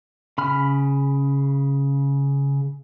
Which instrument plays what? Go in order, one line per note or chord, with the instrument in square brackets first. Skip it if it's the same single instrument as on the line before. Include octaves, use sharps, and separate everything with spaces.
[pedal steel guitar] C#3 B5 F6